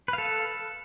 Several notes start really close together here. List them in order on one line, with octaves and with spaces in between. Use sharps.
B4 F5 A4